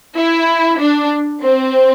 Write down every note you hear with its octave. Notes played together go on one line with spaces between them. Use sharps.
E4
D4
C4